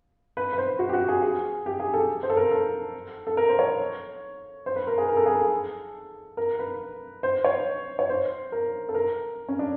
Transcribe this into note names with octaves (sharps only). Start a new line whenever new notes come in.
B4
B4
C5
F#4
G4
F#4
G#4
G#4
G4
G#4
A4
C5
A4
A#4
A4
A4
A#4
C5
C#5
C5
B4
A#4
G#4
A#4
A4
G#4
A4
A#4
B4
C5
C#5
C#5
C5
A#4
A4
A#4
C#4
D4